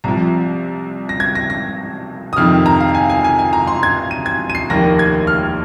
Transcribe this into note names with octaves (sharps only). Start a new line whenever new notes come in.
C2 C3 F3 A#5
A#6
G#6
A#6
A#6
D#6
F2 C3 D#3 F6
A#5
F5
G#5
G#5
G#5
G#5
A#5
C6
G#6
D#7
G#6
D#7
C7
F1 D#2 D#3 A#3 A#6
G#6
F6